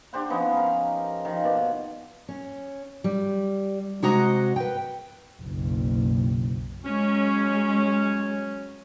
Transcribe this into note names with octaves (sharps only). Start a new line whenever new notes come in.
D4 G4 C5 F#5
F3 B3 C#4 D#4
A#4
D#3 F3
B2 D5
C#4
G3
C3 G#3 F#4 D#5 F#5 A#5
B4 G5
F#1 B1
F#3 G#3 C#4